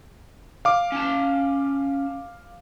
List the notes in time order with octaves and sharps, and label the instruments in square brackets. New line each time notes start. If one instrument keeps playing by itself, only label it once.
[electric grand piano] F5 D6
[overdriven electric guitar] C#4 A5